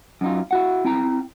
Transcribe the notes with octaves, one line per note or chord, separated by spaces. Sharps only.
F#2 F#3 D#4 F4
E4 F#4 F#5
C4 E4 G5 A#5